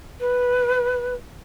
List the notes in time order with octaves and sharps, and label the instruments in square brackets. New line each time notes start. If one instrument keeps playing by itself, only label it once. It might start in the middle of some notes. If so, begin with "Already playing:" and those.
[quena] B4